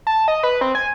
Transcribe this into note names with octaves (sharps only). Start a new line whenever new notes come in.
A5
D#5
B4
C4
G#5